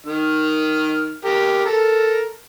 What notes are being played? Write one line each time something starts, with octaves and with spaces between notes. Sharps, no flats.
D#3 F6
G4 A#4
A4 A#4